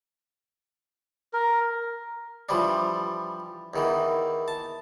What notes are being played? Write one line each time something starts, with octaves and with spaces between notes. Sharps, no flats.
A#4
E3 F3 G3 D4
E2 D#3 E3
A5